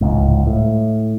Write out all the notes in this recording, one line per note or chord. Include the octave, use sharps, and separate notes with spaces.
D1 C#2 G#2
A2